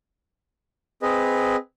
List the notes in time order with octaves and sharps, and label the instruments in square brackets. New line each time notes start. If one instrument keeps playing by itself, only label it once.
[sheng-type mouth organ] C4 G#4 B4 D#5